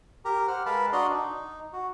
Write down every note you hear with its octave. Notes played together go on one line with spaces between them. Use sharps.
G4 A#4 A#5
C5 F#5 F6
G#3 A#4 B4 F5 A5 B5
D4 F#4 D5 D#5 A#5 C6
D#4
F#4